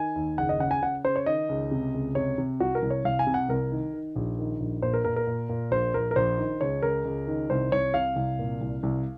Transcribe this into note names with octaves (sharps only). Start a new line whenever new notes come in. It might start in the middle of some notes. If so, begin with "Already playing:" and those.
Already playing: D#3 G#5
D#2
F#1 F#5
D#5
C#3 F#5
G#5
C#3 F#5
C#3 C5
C#5
D#3 D#5
C#2
C3
C#2
C3 C#5
C3
C2 F#4
A#4
C2
C#5
C2 F5
G#5
C3
F#5
C2 A#4
D#3
D#3
A#1
D#3
A#1
A#2 C5
A#4
A#2 A#4
A#4
A#2
A#2
A#1 C5
A#1 A#4
A#4
A#1 C5
D#3
C#2 C#5
C#2 A#4
C#2
D#3
C2 C5
C2 C#5
C3 F5
C2
A#2
C2
C2